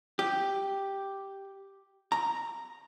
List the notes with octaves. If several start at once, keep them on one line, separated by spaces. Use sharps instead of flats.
G4
A#5